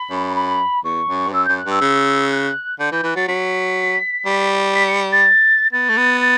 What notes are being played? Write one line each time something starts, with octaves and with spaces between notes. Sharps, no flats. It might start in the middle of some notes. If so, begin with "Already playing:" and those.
Already playing: B5
F#2
B5
E2 C#6
F#2
G2
F#2 E6
F#2 G6
F#6
G2 E6
C#3
F#6
D3 G6
E3 G6
E3 F#6
F#3 A6
F#3 B6
G3
B6
C#7
A6
B3 A6
A3
B3
A6